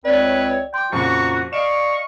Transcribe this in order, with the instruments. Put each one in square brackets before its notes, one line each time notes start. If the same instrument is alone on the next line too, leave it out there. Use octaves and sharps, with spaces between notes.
[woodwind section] C#2 C4 C#5 [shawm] B4 [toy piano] D5
[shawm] G5 [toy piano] C6 D6
[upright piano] F2 A#2 C#3 [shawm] F#4 [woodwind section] A#5 C#6
[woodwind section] D5 D#5 F5 [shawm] C#6 [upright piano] D7 E7